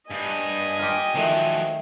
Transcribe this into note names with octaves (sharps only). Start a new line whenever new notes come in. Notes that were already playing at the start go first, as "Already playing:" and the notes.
G2 D#5 G#5
F4 G4
D#3 F3 F#3 A3 G5